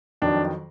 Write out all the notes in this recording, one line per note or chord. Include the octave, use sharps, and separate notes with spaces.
F2 D#3 F#3 D4